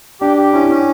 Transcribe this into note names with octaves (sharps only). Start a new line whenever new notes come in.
D4 G4
G4
C#4 E4
C#4